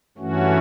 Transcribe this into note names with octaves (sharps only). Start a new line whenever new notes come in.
G2 E3 A3 C#4 F#4